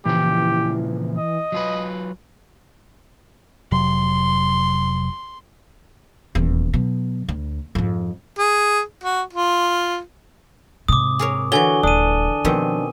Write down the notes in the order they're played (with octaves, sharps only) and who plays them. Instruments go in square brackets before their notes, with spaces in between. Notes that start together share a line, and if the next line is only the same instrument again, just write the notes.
[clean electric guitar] A#2 C#3 F3 [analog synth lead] E3 [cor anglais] G4
[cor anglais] D#5
[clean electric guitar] F#3 F4 B4
[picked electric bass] F1 C3 F#3 [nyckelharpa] C6
[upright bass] D#1 E2
B2 F#3
D2
F2 G#2
[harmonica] G#4
F#4
F4
[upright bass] G#2 C3 [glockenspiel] D6 D#6
[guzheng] G#4 A#4 C#5
[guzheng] D3 E3 [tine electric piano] F#4 C#5 [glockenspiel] G#5 G7
[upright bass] D#1 [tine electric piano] D4 [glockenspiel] D#6 D#7
[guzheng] B2 D#3 C4 [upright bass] F3